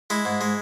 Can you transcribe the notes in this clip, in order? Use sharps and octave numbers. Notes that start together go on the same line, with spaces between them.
G#3 E4
G#2
G#3